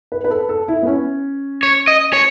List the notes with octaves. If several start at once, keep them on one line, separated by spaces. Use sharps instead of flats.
B4
B4
A4
A4
E4
B3
C#4
C#5
D#5
C#5